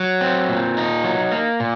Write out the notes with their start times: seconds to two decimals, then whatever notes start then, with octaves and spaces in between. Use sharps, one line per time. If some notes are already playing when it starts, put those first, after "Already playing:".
Already playing: F#3
0.21 C4
0.49 A#2
0.77 D#4
1.04 F#3
1.32 A#3
1.60 A#2